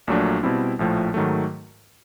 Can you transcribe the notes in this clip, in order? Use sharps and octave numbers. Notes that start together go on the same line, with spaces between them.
A#1 A#2 F#3 A3 D4
B2 G3 C4 E4
A#1 A2 F3 A3
G#2 D#3 F#3 A3